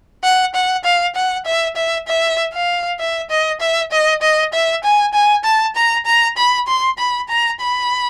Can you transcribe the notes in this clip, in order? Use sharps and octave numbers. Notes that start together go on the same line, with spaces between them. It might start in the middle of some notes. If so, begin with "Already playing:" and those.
F#5
F#5
F5
F#5
E5
E5
E5
F5
E5
D#5
E5
D#5
D#5
E5
G#5
G#5
A5
A#5
A#5
B5
C6
B5
A#5
B5